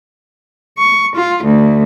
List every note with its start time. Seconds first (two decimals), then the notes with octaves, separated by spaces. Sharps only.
0.78 C#6
1.15 F4
1.45 D2